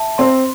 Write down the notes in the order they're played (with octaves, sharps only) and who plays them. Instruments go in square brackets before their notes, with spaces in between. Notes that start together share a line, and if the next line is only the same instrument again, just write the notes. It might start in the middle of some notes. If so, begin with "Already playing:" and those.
Already playing: [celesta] E5 A5
[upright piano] C4 [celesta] C6